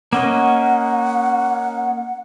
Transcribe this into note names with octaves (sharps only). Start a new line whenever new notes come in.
A#3 C#4 D#5 F#5